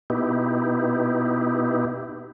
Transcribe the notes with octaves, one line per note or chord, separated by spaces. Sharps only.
B2 B3 D#4 E4 G4